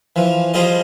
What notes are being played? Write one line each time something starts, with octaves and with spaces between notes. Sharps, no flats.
E3 F3
F3 G3 F4 G#4 C5 D#5